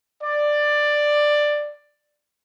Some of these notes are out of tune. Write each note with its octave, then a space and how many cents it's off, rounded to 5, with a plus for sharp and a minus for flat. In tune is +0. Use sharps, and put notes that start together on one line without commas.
D5 +10